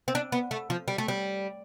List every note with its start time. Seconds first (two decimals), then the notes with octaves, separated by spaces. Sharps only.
0.08 C4
0.15 D4
0.32 B3
0.51 A3
0.70 F3
0.88 G3
0.98 A3
1.08 G3